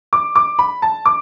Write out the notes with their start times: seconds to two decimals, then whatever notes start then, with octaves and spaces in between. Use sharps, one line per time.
0.13 D6
0.36 D6
0.59 B5
0.82 A5
1.06 D6